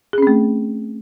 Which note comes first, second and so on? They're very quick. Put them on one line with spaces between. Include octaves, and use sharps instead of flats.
G#4 C#4 C4 A3